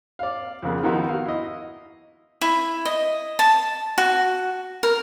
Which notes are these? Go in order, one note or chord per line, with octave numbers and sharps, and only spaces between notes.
D5 F5
F2 C#3 A#3 B3 G#4
D#3 F3 B3 D#4 E4 F#4
F#4 F5
E4 D#5
E4
D#5
A5
F#4
A#4